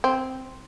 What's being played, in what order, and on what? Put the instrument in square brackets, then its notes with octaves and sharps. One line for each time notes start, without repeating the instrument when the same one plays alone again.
[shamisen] C4